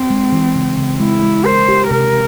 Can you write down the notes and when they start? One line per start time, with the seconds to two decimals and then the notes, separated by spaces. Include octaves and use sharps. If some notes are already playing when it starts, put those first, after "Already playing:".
Already playing: C4
0.10 G#3
0.32 E3
0.56 C#3
0.78 C#3
1.00 G#3 E4
1.23 G#3
1.46 A#4 C5
1.68 G4
1.90 C3 A#4